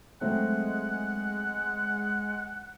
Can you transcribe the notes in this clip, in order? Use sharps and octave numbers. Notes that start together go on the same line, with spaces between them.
F#3 G#3 A3 C4 F#5